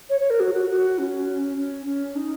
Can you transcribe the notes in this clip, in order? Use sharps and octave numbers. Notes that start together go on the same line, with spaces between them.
C#5
C#5
A#4
F#4
F#4
F#4
C#4
C#4
C#4
D#4